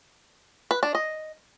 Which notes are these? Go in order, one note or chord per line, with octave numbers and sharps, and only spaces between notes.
B4
D4
D#5